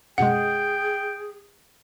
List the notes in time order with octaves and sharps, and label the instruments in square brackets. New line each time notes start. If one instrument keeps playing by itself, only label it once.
[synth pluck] F#2 B2 G#3 [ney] G#4 [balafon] F#5 [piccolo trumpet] G5